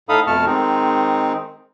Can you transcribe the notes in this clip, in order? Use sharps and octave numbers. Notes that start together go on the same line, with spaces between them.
A2 D#4 A4 F5 B5 D#6
F2 B2 A3 A5 C#6 F6
D#3 G#3 C4 D#4